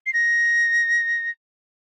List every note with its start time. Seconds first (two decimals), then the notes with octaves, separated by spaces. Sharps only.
0.06 C7
0.13 A#6